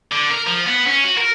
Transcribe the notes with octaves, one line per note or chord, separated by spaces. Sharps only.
D3
A#4
F3
B3
C#4
F#4
A#4